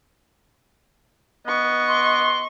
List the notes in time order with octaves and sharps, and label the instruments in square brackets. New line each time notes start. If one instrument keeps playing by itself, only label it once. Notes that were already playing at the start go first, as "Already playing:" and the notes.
[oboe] B3 [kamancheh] D#5 C#6
[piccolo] C6